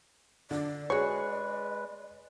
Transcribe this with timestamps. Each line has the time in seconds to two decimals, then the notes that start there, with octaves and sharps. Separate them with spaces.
0.51 D3 D5
0.90 G#3 F#4 G#4 B4 C#5